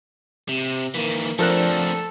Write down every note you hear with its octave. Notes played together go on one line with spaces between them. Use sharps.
C3
D#3 E3 A#3
F3 A3 C4 D4 A4 A#4 F#6